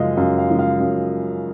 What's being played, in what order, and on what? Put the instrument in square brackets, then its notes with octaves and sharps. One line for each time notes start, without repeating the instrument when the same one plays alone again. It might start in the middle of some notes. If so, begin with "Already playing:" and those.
Already playing: [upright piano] F#2 C#3 F3 G#3 D#5 F5
F#2 F5
F5
C#3 F3 G#3
F5
F#2